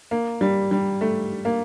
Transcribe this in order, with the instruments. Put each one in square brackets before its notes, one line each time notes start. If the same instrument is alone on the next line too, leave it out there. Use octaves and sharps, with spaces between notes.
[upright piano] A#3
G3
G3
A3
A#3